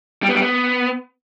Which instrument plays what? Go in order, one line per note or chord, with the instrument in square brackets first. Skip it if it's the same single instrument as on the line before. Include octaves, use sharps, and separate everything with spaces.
[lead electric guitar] G3
B3
G3
B3